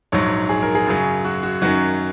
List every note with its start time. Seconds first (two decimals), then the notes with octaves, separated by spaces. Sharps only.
0.12 A#1 G#2 F#3 C#5
0.49 G#4
0.62 A#4
0.75 G#4
0.87 F#2 C#3 F#3
1.25 F#4
1.43 F#4
1.62 F#2 D#3 F#3 F#4